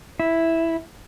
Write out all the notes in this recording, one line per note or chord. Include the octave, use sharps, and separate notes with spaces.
E4